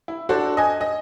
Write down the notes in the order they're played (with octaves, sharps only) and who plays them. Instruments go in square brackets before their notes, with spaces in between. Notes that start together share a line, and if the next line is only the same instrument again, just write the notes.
[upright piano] E4
D4 F#4 A4 C5
D#5 G#5
D#5